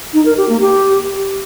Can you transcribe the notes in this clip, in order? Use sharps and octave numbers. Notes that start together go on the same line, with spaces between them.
D#4
A#4
G4
A#3
G4